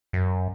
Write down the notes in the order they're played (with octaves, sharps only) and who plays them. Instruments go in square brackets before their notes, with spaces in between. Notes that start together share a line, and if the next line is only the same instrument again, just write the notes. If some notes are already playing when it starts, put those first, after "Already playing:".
[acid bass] F#2